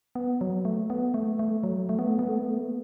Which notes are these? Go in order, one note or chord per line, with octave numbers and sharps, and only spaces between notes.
B3
F#3
A3
B3
A3
A3
F#3
A3
B3
A3
B3
A3
B3
A3
B3